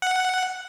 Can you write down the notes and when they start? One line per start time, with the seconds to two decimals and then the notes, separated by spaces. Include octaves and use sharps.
0.02 F#5